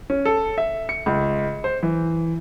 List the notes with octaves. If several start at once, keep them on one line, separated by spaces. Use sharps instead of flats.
C#4
A4
E5
C#7
C#2
C5
E3